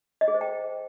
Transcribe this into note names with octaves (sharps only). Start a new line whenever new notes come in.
D#5
G#4
C5
G5